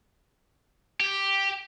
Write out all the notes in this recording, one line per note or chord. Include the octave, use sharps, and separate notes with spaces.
G4